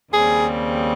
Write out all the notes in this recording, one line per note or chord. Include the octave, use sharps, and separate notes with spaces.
D#2 C#3 G3 C4 G#4